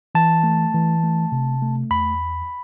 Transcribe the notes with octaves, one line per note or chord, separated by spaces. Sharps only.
E3 A5
A3
E3
A3
C3
A3
E2 B5